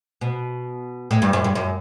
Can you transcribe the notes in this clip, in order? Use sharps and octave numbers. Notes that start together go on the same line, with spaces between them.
B2
A2
G2
F#2
G2
F#2